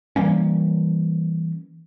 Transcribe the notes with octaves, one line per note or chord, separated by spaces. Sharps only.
E3 G3 A#3 C#4